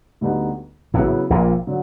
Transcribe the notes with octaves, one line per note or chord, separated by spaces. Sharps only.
D2 D3 G3 B3 D#4
A1 A2 C#3 F#3 B3 E4
A#1 A#2
D3 F#3